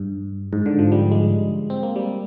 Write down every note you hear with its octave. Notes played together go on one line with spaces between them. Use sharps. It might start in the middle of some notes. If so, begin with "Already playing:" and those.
Already playing: G2
G#2
D3
F3
G3
G#3
C4
A#3
G3